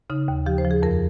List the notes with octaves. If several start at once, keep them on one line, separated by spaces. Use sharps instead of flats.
C#3 D#4
D#2
F3 G4
C5
F3
G#4
F2 A#4